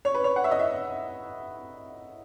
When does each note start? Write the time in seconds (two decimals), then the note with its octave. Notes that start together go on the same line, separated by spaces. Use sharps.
0.05 C#5
0.14 B4
0.24 C#5
0.36 F#5
0.44 E5
0.51 D#5
0.59 E5